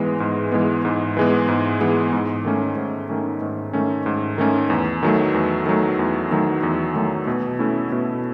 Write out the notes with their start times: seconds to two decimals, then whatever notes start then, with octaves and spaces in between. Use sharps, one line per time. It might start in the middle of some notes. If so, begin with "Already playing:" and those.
Already playing: G#2 E3 G#3 B3
0.20 G#2
0.52 E3 G#3 B3
0.85 G#2
1.17 E3 G#3 B3
1.48 G#2
1.81 E3 G#3 B3
2.13 G#2
2.45 D#3 A3 C#4
2.77 G#2
3.09 D#3 A3 C#4
3.42 G#2
3.73 D#3 A3 C#4
4.06 G#2
4.38 D#3 A3 C#4
4.70 E2
5.03 D#3 F#3 A3
5.34 E2
5.66 D#3 F#3 A3
5.99 E2
6.31 D#3 F#3 A3
6.63 E2
6.96 D#3 F#3 A3
7.27 B2
7.59 A3 C#4 E4
7.92 B2